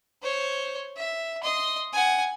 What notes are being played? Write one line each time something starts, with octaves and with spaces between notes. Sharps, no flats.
C5 C#5
E5
D#5 C6
F#5 G#5